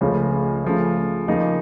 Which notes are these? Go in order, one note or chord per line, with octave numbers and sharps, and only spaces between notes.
C#2 C#3 F3 A3 C#4
C#3 F3 A3
C#3 F3 A#3 D#4